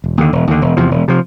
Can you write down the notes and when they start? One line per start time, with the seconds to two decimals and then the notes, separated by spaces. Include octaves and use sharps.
0.04 E1
0.17 D#2 D3
0.33 E1
0.47 D#2 D3
0.62 E1
0.77 E2 C3 F3
0.91 E1
1.08 C3 F3